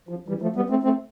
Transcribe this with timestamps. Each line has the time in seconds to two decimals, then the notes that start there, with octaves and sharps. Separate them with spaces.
0.09 F3
0.28 E3 G3
0.42 F3 A3
0.56 G3 B3
0.70 A3 C4
0.83 A3 C4